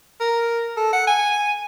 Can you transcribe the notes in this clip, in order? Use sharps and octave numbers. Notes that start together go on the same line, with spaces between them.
A#4
A4
F#5
G#5